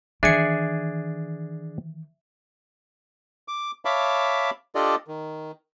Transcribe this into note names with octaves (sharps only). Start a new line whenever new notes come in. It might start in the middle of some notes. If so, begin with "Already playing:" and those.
D#3 E3 D4 G#4 E5 G#5 C#7
D6
C#5 E5 F5 A5 B5 D6
D4 F4 G4 A4 D5 D#5
D#3